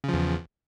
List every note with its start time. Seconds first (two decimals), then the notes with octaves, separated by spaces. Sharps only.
0.04 C#3
0.09 F3
0.14 E2